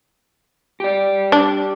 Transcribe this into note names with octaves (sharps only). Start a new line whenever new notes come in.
G4 D5
D4